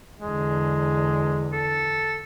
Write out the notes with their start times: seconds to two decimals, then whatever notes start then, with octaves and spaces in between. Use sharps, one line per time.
0.21 E2 D3 G#3
1.52 A4